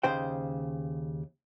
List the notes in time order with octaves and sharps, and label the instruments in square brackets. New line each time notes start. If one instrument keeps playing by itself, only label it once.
[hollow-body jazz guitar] D#2 C#3 C5 G5